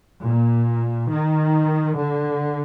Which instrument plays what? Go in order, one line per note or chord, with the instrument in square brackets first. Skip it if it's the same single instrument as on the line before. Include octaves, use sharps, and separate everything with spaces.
[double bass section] A#2
D#3
D3